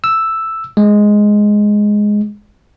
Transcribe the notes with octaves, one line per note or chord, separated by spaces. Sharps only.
E6
G#3